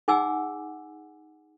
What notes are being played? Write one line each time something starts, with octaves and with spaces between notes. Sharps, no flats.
D#4 G#4 F#5 G#5 D6 E6